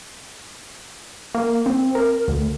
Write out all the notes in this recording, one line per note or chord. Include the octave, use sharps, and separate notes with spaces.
A#3
C4
A#4
D2